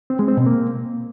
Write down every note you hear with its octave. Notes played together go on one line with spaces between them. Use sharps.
C4
G#3
C4
B2
A#3